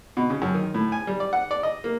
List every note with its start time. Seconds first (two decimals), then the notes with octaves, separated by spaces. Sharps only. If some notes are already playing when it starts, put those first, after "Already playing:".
0.17 B2
0.30 C#3
0.42 F#2
0.54 D#3
0.74 A2
0.92 G#5
1.07 G3
1.20 D5
1.33 F#5
1.51 D5
1.63 D#5
1.84 A#3